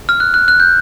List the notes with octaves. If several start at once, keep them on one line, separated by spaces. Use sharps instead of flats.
F6
F#6
F#6
F#6
G6